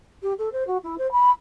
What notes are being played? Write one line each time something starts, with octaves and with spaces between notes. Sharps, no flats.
G4
A4
C5
F#4
E4
C5
B5